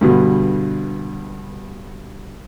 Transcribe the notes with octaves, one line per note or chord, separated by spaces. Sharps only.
G2 B2 D3